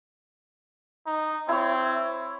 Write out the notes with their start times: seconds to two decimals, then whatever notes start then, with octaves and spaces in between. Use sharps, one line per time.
1.07 D#4
1.49 C4 E4 C#5